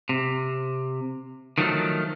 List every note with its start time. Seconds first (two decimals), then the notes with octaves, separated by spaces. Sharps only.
0.09 C3
1.58 D#3 F3 F#3 A3